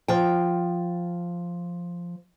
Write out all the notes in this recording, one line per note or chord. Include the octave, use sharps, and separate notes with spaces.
F3 G5